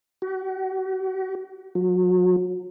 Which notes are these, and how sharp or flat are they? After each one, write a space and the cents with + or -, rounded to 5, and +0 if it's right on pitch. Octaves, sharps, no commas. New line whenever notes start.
F#4 +40
F#3 -35